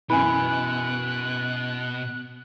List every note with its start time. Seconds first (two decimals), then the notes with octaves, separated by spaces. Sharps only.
0.10 F#2 B2 E3 G#5 B5 F#6